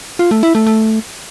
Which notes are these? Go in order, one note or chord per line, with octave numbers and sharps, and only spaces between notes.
F4
A3
E4
A3
A3